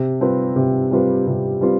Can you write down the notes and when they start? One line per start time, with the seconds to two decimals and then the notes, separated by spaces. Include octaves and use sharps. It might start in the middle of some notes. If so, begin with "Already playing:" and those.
Already playing: C3
0.20 G3 C4 F4 B4
0.56 C3
0.91 G3 C4 F4 B4
1.27 C3
1.61 G3 C4 F4 B4